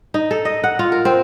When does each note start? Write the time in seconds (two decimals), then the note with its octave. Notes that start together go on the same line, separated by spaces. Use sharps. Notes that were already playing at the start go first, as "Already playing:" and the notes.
0.14 D#4
0.31 A4
0.45 D#5
0.64 F#5
0.79 F4
0.92 A#4
1.05 C4